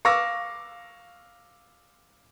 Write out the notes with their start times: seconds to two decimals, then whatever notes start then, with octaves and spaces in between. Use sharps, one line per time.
0.05 F5 C#6 D6 E6 A#6